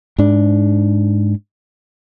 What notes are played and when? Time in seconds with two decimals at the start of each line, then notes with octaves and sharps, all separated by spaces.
0.18 G#2 D4